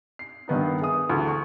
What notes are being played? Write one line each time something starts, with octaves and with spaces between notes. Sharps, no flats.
C7
G2 D#3 B3 D#4
G#4 E5 D#6
D2 E3
C#6